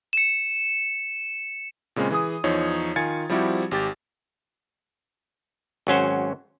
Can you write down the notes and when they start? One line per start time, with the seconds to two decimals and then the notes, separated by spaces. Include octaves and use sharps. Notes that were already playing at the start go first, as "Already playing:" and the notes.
0.13 C#7 E7
1.96 A#2 C#3 G#3 C4 C#4
2.10 E3 G#4 D#6
2.44 E2 F3 D#4 C#5
2.96 D#3 F4 G#5 G#6 A6 C#7
3.29 F3 G3 C4 E4 F#4 G4
3.71 G#1 G4 A6
5.87 G#1 F#3 C#4 C5